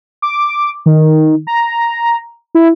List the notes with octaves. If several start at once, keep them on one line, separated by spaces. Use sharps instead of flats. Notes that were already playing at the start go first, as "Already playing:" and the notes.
D6
D#3
A#5
E4